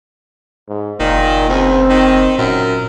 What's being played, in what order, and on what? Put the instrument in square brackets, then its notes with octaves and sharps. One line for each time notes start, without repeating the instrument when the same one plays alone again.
[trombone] G#2
[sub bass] F#1 [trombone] A#2 [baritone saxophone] D#3
[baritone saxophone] C#2 [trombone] C4
[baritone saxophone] D#3
[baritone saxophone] F#2 [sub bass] A#2